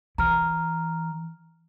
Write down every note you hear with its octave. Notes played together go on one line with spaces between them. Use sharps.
E3 A#5 F6